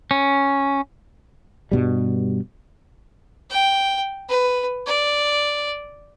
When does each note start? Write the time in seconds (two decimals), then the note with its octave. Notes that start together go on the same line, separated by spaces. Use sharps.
0.11 C#4
1.72 G2 B2 G3
3.50 G5
4.29 B4
4.87 D5